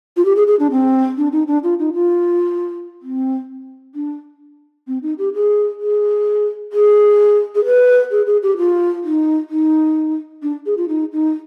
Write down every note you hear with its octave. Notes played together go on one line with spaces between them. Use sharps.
F4
G4
G#4
G#4
D4
C4
D4
D#4
D4
F4
D#4
F4
C4
D4
C4
D#4
G4
G#4
G#4
G#4
G#4
B4
G#4
G#4
G4
F4
D#4
D#4
D4
G#4
F4
D#4
D#4